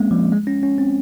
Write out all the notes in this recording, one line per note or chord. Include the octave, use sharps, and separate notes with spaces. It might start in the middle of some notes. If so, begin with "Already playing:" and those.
Already playing: G#3 A#3 C4 C#4
F3
G#3
C#4
C#4
C4